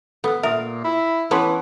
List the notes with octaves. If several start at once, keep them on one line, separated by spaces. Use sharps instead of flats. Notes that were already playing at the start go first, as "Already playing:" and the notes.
B3 A4 E6
A#2 A#4 E5 D#6
E4
E3 B3 C#4 B4 A5 C6